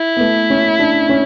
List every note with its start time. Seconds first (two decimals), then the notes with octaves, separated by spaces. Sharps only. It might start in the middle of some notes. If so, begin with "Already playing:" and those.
Already playing: E4
0.17 B3
0.20 A3
0.50 C#4
0.79 D4
1.09 C#4